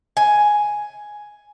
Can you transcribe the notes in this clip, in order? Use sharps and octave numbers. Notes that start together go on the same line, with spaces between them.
G#5